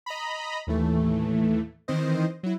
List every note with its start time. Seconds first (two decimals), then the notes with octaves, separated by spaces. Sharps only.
0.06 D#5 A#5 B5
0.67 D#2 A2 E3 A3
1.88 D#3 E3 C4 C5 D#5
2.43 F#3 E4